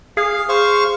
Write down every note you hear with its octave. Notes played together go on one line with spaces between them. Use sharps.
G#4 F5
C5 F5 C#6